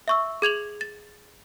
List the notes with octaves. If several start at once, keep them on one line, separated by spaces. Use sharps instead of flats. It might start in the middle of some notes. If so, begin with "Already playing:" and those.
E5 C#6 E6
G#4 G#6 F7 F#7
A6